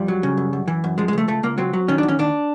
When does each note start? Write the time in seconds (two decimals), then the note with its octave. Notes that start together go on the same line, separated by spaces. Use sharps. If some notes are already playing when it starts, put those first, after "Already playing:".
Already playing: F2 G3
0.08 F#3
0.23 C#3
0.37 F#2
0.53 F#2
0.68 E3
0.84 F#2
0.98 F3 G#3
1.08 G#3
1.13 C#2 A3
1.28 C#2 A3
1.43 C#2 A#3
1.58 F#3 C4
1.73 F#3
1.88 D#3 C#4
1.98 D4
2.03 E2
2.08 C#4
2.19 D#2 D4